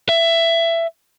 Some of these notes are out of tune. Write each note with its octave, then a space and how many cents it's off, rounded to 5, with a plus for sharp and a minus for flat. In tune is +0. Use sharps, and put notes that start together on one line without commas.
E5 +15